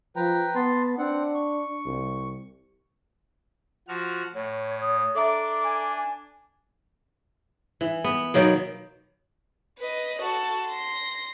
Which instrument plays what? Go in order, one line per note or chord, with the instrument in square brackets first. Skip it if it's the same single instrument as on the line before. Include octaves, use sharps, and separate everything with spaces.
[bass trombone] F3 [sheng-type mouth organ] B4 G5 A#5
[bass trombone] B3 [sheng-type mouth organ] A5 C6
[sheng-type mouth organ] C4 F#5 [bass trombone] D4
[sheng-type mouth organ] C#6
[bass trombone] C2
[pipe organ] F3 F#4 F6
[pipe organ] A2 [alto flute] C#5
[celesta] D#6
[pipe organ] D4 [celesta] A4 E5 A#5 [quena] D6
[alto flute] G#5
[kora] E3
B3
B2 D#3 F#3 A#3
[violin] B4 D#5
F#4 A4
C6 A#6